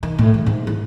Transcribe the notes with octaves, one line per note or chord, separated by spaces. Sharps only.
D#3
A2
D#3
G#2
E4